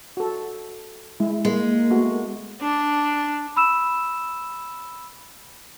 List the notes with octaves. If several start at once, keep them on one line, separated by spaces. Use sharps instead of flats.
F#4 A4
G#3 E4
G#3 A#3
A3 B3 F#4
D4
B5 E6 E7